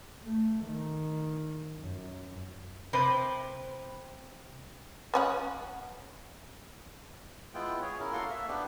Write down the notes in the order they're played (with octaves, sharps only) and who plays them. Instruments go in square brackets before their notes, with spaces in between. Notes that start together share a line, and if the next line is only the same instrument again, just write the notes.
[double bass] A3
D#3
F#2
[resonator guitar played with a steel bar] C3 B4 C5
[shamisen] B3 C#4 F#5
[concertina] G#3 B3 E4 F4 G5
G#4 C#5
C#4 E4 A#4
A#3 F#4 A4 F5 C6
E5
B3 D4 G4